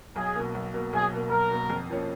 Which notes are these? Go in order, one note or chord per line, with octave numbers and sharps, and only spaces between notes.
B1 G#4
B2 A#3
B1
B2 A#3
B1 G#4
B2 A#3
B1 A#4
B2 A#3
F2
F3 A#3 C#4